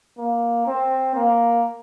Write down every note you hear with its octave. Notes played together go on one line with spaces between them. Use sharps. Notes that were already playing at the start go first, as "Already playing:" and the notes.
A#3
C4
A#3